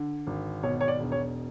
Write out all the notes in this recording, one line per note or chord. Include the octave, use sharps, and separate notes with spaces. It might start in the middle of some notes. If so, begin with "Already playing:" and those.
Already playing: D3
G#1
B2 C#5
C#5
D5
E1
C#5